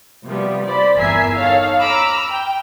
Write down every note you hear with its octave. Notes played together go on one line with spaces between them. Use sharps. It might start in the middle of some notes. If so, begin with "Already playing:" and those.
C3 F3 G3 B3
C5 D5 B5
G1 E2 A#4 E5 G#5 C7
D#4 A4 C#5 F5
A#5 B5 D6 E6 F6
G5